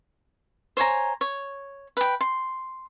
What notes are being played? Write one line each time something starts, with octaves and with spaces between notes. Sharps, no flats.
C5 C#5 G#5 A#5
C#5
B4 G5
C6